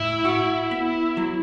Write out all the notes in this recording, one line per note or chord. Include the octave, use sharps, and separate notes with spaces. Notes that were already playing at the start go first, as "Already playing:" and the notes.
Already playing: A2 E4
F#4
B3
F#3